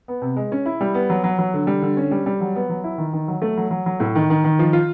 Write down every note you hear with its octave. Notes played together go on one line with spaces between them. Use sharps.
B3
C3
G#3
C#4
E4
G3
B3
F#3
F#3
F#3
D3
G3
D3
C#4
G3
G3
F#3
B3
F#3
E4
D#3
D#3
F#3
A3
F#3
F#3
F#3
A2
D#3
D#3
D#3
F3
F4